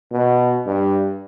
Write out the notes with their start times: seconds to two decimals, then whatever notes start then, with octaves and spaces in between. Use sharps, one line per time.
0.12 B2
0.66 G2